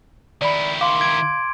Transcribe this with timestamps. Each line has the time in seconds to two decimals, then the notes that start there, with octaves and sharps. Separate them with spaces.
0.42 D#3 E4 D5 B5
0.81 F5 C6 D6
1.01 G#6 D7